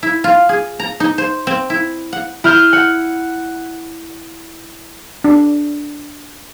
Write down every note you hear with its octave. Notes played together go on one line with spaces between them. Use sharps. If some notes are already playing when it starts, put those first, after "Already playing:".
E4
F4
G#4
A#5
D#4
C5
C4
E4
F#5
E4 F6 G6
F#5
D4